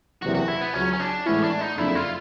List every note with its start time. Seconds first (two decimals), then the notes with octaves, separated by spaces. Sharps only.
0.22 F#1 E2 C3 F#4
0.34 F#4
0.48 E4
0.61 B3
0.74 C#2 C#3 F#3 C#4
0.93 C#4
1.00 D4
1.26 A2 E3 G#3 B3 C#4 E4
1.44 D4
1.61 D#4
1.77 F#1 F2 D3 E4
1.95 F4